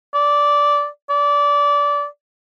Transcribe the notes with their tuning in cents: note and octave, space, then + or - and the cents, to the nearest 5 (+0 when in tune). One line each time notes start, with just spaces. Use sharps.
D5 -10
D5 -20